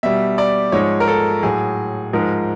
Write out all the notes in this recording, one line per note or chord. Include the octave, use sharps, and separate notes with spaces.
B2 G3 E5
D5
G#2 F3 G#3 C#5
A#4
A4
A2 F#3 G#4
G#2 F3 G#3 A#4